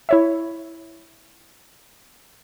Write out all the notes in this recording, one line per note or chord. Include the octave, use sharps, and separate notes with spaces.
E4 C#5 E5